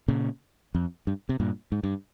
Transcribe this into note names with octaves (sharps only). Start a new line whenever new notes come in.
A#2 C#3
F2
G2
C3
G2 A#2
G#2
G2